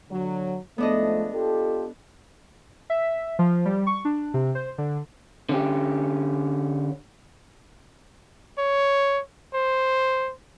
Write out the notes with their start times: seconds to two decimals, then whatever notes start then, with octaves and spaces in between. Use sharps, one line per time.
0.10 D3 F#3
0.78 G#2 F3 A3 B3 D4 D#5
1.33 F4 G4 A4
2.90 E5
3.39 F3
3.65 G3
3.87 C#6
4.05 D4
4.34 C3
4.55 C5
4.78 D3
5.49 D3 C#4 G4
8.58 C#5
9.54 C5